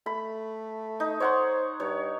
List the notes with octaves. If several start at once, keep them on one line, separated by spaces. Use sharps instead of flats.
A3 B5
D#4
C5 C#5 F#5 C6
G2 C#5